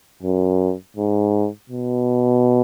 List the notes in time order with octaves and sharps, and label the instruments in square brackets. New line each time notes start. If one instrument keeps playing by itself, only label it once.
[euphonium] F#2
G#2
B2